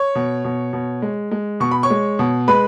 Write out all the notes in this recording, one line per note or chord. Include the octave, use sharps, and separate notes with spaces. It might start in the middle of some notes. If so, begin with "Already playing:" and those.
Already playing: C#5 C#6
B2
B2
B2
G#3
G#3
B2 C#6
B5
C#5 C#6
G#3
B2
G#3 B4 B5